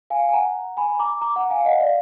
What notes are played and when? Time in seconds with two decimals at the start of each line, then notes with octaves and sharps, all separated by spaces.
0.10 F5 G#5
0.29 G#5
0.33 F#5 A#5
0.77 G#5 B5
0.99 A#5 D6
1.21 A#5 D6
1.36 F#5 A#5
1.50 F5 G#5
1.60 F5
1.65 D#5 F#5
1.80 D5 F5